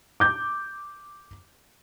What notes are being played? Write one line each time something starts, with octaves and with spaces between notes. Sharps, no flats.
D6 G6